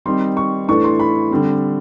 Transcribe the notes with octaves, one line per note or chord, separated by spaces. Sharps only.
D#3 G3 C4 D#4 C6
C#6
A2 E3 A3 D4 C#6
C6
B5
D3 G3 C4